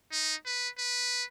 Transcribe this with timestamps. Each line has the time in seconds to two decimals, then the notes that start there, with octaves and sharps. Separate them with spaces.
0.12 D#4
0.45 B4
0.78 B4